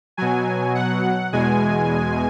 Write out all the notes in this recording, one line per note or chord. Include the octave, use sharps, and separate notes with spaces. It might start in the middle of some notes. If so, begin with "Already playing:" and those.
B2 F#3 G#5
F#5
E2 B2 G#3 G#5